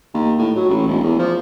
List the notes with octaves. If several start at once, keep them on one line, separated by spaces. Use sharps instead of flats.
D#2
A2
F#3
A1
E1
E2
F3